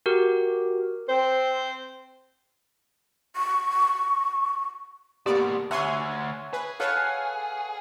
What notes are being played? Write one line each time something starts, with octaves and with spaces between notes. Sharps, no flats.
F#4 G4 A#4
C4 C5
C#6
G#2 B2 A#3 B3 G4 D5
D2 C#5 E5 F#5 G#5 C6
G#4 B4
A4 B4 C#5 F5 F#5